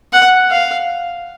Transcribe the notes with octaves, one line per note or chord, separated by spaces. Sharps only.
F#5
F5